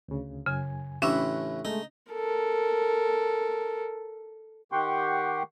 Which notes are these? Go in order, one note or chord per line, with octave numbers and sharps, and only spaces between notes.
D2 C#3
F#2 C#3 G#5
A1 A2 C#4 D4 E5 B5 C#6 F#6
G#3 A3 D#4
A4 A#4
D#3 G4 F#5 G5 C6 C#6